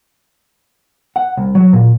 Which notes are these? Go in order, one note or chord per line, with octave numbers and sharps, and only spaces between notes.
F#5
C2
F#3
A#2